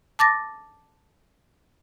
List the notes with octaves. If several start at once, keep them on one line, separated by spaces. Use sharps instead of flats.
A5 D6 A6 A#6